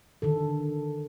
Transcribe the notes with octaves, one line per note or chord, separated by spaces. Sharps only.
D3 D#3 A4